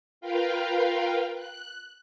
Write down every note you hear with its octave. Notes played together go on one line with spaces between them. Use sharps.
F4 A#4 B4 F5 G5
F#6